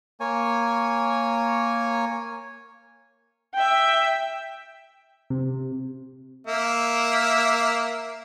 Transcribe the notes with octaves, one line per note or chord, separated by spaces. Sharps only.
A#3 C#5 G#5
E5 G5
C3
A#3 E5